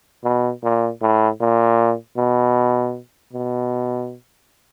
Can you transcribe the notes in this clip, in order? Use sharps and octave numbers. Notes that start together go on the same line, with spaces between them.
B2
A#2
A2
A#2
B2
B2